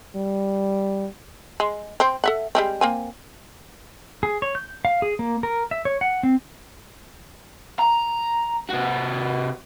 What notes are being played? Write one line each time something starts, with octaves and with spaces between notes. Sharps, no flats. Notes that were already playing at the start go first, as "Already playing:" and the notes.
G3
G#3
C4 C5
A4 E5 F#5
G3 G#3 C4
A#3 C4 G#5
G#4
C#5
G6
F5
G#4
A#3
A#4
E5
C#5
F#5
C4
A#5
C3 F#4